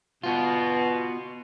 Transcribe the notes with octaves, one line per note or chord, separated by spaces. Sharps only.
B2 B3 F4